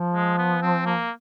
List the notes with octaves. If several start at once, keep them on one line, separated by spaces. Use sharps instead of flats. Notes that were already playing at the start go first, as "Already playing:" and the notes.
Already playing: F3
G#3
B3
C4
A#3